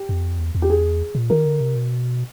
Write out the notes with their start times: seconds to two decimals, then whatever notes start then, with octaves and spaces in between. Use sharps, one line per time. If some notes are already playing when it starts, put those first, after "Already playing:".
Already playing: G4
0.09 F2
0.39 E2
0.55 E2
0.62 G4
0.70 G#4
1.15 A#2
1.30 D#3 A#4
1.45 D3
1.60 C3
1.76 B2